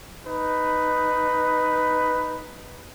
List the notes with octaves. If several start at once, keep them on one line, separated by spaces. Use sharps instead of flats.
D#4 B4